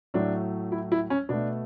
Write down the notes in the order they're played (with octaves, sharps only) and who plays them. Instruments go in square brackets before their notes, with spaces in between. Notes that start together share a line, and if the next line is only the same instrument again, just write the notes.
[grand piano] A2 F#3 A3 D4
E4
E4
C#4
B2 A3 D4